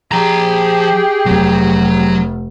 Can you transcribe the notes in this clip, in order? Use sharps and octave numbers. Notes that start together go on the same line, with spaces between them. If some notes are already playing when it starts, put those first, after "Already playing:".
F3 G4 G#4 A#5
F1 F#3